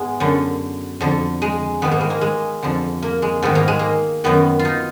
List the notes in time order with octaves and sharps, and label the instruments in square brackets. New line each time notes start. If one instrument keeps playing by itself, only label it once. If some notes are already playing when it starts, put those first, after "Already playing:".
Already playing: [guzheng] G#2 G#3 B3
F#2 D3
F2 D3
G#3
G#2 D#3 B3
A#3
G#3
A#3
G#3
F2 D3
A#3
G#3
G#2 D#3 B3
A#3
G#3
A#3
F#2 D#3 B3
F4
D#4